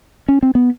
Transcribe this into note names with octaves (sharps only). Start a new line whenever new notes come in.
C#4
C4
B3